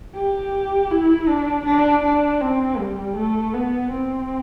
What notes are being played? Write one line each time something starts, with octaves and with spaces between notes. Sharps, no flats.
G4
E4
D4
D4
D4
C4
G3
A3
B3
C4